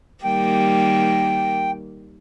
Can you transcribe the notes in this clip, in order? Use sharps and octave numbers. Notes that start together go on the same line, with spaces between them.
D#3 G3 A#3 G5